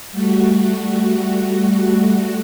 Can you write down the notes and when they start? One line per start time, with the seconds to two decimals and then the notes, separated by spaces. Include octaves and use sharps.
0.12 G3 A3 F#4